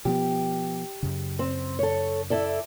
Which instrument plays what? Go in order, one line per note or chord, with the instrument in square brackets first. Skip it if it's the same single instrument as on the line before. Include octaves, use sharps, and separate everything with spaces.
[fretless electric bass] B2 F3 B3 [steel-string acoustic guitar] G4
[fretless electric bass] F#2 C#3
[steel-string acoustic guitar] C4
A4 C#5
E4 A4 D5